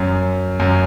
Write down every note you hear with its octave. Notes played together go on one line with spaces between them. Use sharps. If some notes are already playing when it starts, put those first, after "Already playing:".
Already playing: F#2
F#2